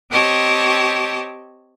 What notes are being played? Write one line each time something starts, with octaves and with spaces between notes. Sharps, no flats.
C4 G4 C#5 D#5 A5